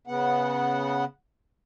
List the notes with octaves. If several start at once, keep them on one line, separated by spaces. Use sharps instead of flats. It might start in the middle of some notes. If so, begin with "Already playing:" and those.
C#3 B3 F#5